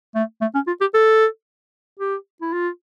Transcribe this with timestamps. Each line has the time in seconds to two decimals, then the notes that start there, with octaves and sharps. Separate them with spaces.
0.15 A3
0.41 A3
0.55 C#4
0.67 F4
0.81 G4
0.94 A4
2.00 G4
2.42 E4
2.53 F4